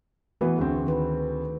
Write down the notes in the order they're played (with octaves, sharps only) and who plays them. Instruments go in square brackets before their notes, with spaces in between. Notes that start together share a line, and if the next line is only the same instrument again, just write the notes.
[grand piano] E3 B3 [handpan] A3 F#4
[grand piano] D2 C4 [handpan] G#4
[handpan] D#3 B4